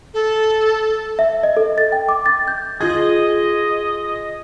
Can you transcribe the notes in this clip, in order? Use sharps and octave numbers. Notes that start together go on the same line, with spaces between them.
A4
E5
D#5
A4
A6
G5
D6
A6
G6
F4 G#4 D#5 G#6